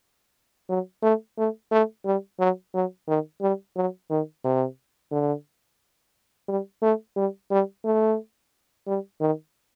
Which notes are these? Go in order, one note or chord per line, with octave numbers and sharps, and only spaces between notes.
F#3
A3
A3
A3
G3
F#3
F#3
D#3
G3
F#3
D#3
C3
D3
G3
A3
G3
G3
A3
G3
D#3